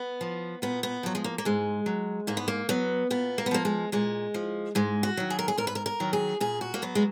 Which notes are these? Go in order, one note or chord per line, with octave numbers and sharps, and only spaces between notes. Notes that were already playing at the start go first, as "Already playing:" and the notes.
Already playing: B3
F3
A#2 B3
B3
F3 F#3
G#3
A#3
A#3
G#2 G#3
F#3
G#2 A#3
B3
A#3
F#3 B3
A#2 B3
A#3
B3
F3 A#3
G#3
A#2 G#3
F3
G#2 G#3
F#4
D#3 F#3
G#4
A#4
G#4
G#2 A#4
B4
A#4
A#4
D#3 F#3
G#4
A#2 G#4
F#4
A#3
F#3 B3
G#3